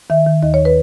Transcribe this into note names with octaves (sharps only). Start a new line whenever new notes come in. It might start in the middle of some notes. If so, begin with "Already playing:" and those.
D#3 E5
D#3
D#2 D#5
C#5
B4